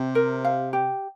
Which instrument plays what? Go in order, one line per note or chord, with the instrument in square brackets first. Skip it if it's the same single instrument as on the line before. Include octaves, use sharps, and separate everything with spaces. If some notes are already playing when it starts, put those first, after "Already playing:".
Already playing: [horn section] C3
[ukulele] A#4
F5
G4